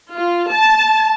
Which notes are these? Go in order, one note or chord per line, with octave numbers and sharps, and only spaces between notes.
F4
A5